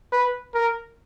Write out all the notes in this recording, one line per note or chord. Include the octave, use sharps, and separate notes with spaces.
B4
A#4